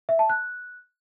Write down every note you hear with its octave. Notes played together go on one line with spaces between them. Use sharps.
E5
A5
F#6